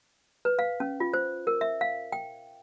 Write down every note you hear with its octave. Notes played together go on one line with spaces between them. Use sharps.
B4
F5
C#4
F4
C5
A#4
E5
F5
G5